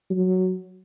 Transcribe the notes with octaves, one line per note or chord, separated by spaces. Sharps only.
F#3